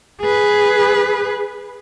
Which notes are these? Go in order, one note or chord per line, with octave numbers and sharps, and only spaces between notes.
G#4 B4